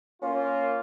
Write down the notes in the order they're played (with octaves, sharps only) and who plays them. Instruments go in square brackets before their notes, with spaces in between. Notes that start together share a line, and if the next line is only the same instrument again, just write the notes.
[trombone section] A#3 F4 [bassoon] C#4